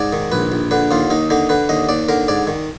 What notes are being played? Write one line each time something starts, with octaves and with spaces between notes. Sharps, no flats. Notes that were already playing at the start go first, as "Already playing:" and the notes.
Already playing: G#2 D5
D#3
A#1 B4
A#1
D3 B4
D#2 F4
D#2 D#4
D3 D#4
D3 B4
D#2 D#5
D#2 D5
D3 A#4
G#2 D5
D#3